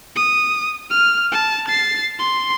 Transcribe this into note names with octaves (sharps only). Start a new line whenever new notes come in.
D#6
F6
A5
A6 C7
C6